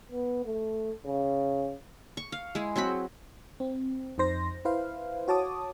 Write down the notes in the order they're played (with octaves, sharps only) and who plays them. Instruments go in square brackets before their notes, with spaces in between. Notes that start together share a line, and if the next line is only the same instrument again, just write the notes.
[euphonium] B3
A3
C#3
[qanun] C#6
F5
G#3 E4 G#4
F#3 C4 F#4 B5
[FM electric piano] C4
F2 D#4 C5 A#6
E4 B4 C5 F5
F#4 C#5 A5 D6 D#6